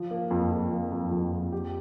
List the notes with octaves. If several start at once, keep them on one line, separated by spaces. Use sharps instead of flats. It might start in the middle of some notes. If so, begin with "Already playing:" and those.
Already playing: F3
A#3
F2
F2
A#3
F2
F2
F2
G4